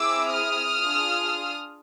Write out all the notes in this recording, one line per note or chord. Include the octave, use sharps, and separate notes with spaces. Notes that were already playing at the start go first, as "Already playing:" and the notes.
Already playing: C4 E4 G#4 D6 E6
D#6 F6
D4 F4 G#4